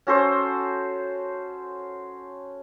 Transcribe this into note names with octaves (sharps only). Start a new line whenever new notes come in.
C#4 F#4 A4 C5